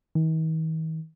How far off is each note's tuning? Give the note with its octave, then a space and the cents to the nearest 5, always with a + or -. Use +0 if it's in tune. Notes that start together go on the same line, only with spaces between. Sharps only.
D#3 +45